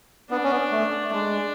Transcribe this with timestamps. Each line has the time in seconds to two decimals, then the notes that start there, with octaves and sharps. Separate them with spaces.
0.30 B3 D4
0.44 C#4
0.51 B3
0.71 A3
1.05 A3
1.12 G#3 D4